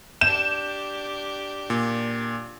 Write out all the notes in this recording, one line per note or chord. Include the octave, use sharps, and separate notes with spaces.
D4 G4 G6 E7
A#2